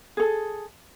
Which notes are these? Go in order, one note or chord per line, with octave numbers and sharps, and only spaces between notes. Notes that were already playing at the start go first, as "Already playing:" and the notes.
G#4 A4